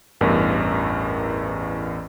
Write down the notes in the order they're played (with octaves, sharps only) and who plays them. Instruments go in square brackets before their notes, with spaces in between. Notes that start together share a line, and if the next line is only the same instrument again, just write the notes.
[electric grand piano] A1 E2 G2 A#4